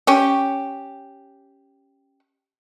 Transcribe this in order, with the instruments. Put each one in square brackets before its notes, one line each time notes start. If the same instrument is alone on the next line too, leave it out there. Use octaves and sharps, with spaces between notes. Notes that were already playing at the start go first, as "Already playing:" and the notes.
[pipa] C#4 G4